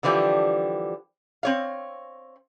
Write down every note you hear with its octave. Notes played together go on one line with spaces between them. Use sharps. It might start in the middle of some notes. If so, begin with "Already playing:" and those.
D3 E3 F3 G3 D4 G4
C4 C#5 F5